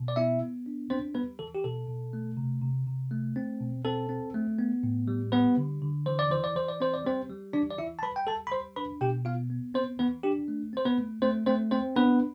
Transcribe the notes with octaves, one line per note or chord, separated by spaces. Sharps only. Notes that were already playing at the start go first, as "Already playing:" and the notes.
Already playing: B2
D5
B3 E4 E5
B3
D4
C4 D4 C5
G3 B3 B4
E3 A4
G4
B2 A4
B2
A3
C3
C3
C3
A3
C4
B2
C4 A4
C4
A3
B3
A2
G3
G3 B3 B4
D3
D3
E3 C5
D5
E3 C5
D5
E3 C5
D5
C4 C5
D5
G3 C4 C5
G3
E3 D4 D5
D5
E3 E4 E5
A5
G3 B4 B5
G5
G3 A4 A5
B5
G3 C5 C6
D4 B4 B5
B2 G4 G5
B3 F4 F5
B3
B3 C4 C5
E3 B3 B4
D4 G4
A3
C4 C5
B3 B4
A3
A3 C4 C5
A3 C4 C5
C4 C5
B3 D4 B4